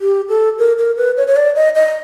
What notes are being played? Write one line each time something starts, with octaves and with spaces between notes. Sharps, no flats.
G4
A4
A#4
A#4
B4
C#5
C#5
D5
D#5
D#5